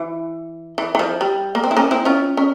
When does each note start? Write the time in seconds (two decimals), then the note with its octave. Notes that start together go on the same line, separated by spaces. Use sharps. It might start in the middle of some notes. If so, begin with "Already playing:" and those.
Already playing: E3
0.78 E3
0.95 E3
0.99 F3
1.21 G3
1.55 A#3
1.64 C4
1.71 E4
1.77 A#3 C#4
1.91 C4 E4
2.05 C#4 F4
2.37 C#4